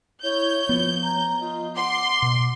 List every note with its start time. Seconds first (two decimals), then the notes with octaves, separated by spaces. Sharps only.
0.23 E4 C#5 G6
0.69 F3 B3 C#5
1.02 A#5
1.40 F4 D#5
1.75 F#5 C6 D6
2.22 B2